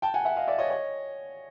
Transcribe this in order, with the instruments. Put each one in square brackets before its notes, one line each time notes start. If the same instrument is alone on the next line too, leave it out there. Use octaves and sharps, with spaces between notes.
[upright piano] G5 A5
F#5 G#5
E5 F#5
D#5 F5
D5 E5
C#5 D#5
C#5 D#5